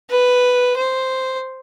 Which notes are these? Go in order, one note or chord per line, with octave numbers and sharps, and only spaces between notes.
B4
C5